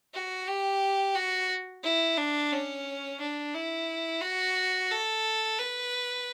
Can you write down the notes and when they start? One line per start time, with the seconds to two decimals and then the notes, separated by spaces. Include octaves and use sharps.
0.14 F#4
0.47 G4
1.16 F#4
1.84 E4
2.17 D4
2.52 C#4
3.20 D4
3.55 E4
4.22 F#4
4.91 A4
5.59 B4